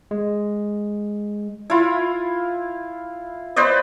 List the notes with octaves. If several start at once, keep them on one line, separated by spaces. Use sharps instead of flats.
G#3
E4 F4
B4 C5 D5 D#5